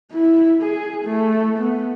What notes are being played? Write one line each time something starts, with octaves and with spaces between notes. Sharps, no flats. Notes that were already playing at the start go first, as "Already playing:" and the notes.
E4
G#4
A3
B3